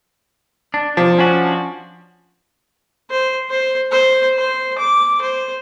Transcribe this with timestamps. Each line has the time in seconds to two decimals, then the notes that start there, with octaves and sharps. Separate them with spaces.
0.74 D4
0.97 C3 F3 D4
1.19 C#4 D4 F#4
3.11 C5
3.50 C5
3.92 C5
4.37 C5
4.78 D6
5.22 C5